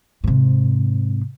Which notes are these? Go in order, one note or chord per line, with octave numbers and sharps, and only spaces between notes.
G#2 C3